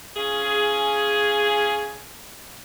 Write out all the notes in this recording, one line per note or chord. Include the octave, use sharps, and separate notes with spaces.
C#4 F4 G#4